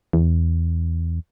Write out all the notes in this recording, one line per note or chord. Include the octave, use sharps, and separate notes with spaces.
E2